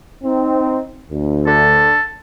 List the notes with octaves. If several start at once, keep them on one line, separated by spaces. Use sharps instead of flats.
C4 D#4
D2
D3 A4